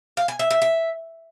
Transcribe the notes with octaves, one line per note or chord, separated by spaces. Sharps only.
F5
G#5
E5
E5
E5